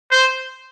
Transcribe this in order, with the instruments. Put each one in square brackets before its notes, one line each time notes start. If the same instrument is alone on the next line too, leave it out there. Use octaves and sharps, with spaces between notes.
[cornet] C5